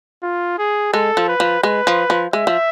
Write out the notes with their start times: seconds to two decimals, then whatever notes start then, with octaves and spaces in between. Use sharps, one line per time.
0.23 F4
0.59 G#4
0.93 G#3 A4
1.17 F3
1.28 B4
1.40 F3
1.63 G#3 B4
1.87 F3
2.10 F3
2.33 G#3 E5
2.47 F3